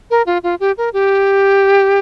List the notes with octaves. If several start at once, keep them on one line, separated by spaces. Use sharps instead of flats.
A#4
F4
F4
G4
A#4
G4